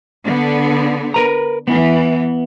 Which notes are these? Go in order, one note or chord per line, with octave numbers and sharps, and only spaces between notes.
D3 B3
A#4 B4 A#5
E3 B3